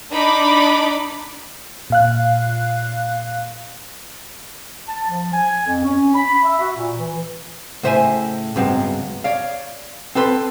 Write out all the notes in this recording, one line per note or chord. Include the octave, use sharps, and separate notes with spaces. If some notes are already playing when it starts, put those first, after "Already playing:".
D4 D#4 B5 D6
A#2 F5 F#6
A5
F3
G#5
F2
C#4
B5
E5
F#4
A#2
E3
A2 C#3 C5 E5 F#5 G#5
C#2 G2 F#3 B3 C4
C#5 D5 F5
C4 A4 B4 C6